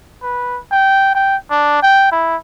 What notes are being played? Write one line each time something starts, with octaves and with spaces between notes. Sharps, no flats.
B4
G5
G5
D4
G5
E4